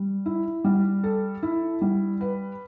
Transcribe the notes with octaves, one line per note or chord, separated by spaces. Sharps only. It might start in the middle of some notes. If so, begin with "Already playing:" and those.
Already playing: G3
E4
G3
A4
E4
G3
B4